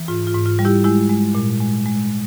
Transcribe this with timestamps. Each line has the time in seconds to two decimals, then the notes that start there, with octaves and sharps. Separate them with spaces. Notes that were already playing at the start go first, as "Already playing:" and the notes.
Already playing: E3
0.08 G#2 F4
0.27 F4
0.34 G#2
0.46 F4
0.59 G3
0.65 E4 G4
0.84 G#3 E4 G4
1.10 G#3
1.35 A#2
1.60 G#3
1.86 G#3